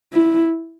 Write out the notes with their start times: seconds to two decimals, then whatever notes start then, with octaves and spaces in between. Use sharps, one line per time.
0.13 E4